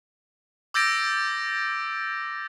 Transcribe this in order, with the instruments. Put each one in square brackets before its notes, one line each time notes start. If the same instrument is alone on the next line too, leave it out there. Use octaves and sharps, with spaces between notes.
[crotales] D6 E6 G6 A6 A#6 D7